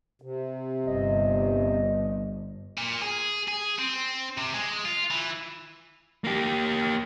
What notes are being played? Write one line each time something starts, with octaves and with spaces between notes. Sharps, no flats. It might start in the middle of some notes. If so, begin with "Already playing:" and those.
C3
G1 G2 D#5
A#2
G#4
G#4
C4
C3
G#3
F4
E3
A#3 G4